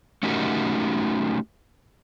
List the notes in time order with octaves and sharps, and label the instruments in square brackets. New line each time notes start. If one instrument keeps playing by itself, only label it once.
[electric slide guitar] A3 C#4 D#4 F#4 G4 A#4